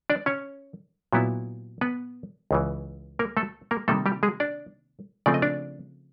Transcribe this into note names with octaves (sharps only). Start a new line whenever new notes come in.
D4 D5
C#4 C#5
A#2 F#3 B3 E4
B3 B4
C#2 C#3 E3
A#3 A#4
A3 A4
A#3 A#4
C3 D#3 G3 A3 A#3 A4
G3 G4
G#3 G#4
D4 D5
C#3 F3 A3 C4 D5
D#5
D4 D5